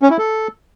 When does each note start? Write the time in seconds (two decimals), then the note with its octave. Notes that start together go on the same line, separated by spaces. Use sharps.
0.02 C#4
0.10 E4
0.18 A4